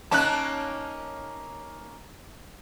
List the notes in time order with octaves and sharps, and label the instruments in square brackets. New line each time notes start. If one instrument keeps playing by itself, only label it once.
[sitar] A#3 C#4 D#4 [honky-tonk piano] A5 F#6